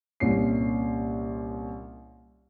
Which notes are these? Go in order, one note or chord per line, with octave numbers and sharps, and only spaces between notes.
C2 A#2 C#4 C7